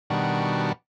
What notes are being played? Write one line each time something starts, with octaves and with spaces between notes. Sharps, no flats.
B2 D#3 G3 D4 F#4